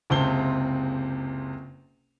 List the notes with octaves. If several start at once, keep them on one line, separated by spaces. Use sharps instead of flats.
F#1 C#2 C3 C4 A5 G7